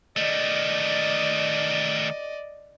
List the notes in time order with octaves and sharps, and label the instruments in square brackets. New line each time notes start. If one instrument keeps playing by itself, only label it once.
[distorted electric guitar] D#3 A3 [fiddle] D5 D#5